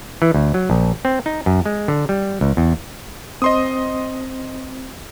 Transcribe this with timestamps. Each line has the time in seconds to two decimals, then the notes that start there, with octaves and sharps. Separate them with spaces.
0.22 E3
0.34 D2
0.54 F#3
0.70 A#1
1.05 C4
1.26 D#4
1.46 F#2
1.66 G#3
1.88 D3
2.09 G3
2.41 C#2
2.57 E2
3.42 C4 C5 D#5 C6 D#6